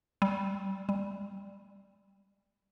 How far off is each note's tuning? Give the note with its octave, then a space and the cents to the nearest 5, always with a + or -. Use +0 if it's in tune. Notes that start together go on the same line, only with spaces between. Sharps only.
G3 -20
G3 +0